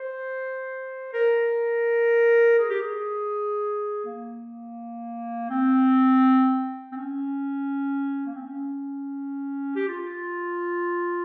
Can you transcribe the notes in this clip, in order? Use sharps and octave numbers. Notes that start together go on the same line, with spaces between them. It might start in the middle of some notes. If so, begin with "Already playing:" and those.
Already playing: C5
A#4
G#4
G4
G#4
A#3
C4
C4
C#4
A#3
C4
C#4
G4
F4